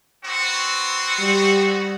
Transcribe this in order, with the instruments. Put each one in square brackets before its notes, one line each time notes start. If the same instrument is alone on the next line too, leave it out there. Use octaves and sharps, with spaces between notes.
[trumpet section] B3 C4 F#4
[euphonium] G3